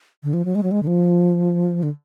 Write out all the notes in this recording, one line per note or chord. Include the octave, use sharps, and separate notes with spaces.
D3
F3
F#3
G#3
F#3
G#3
D3
F3
D3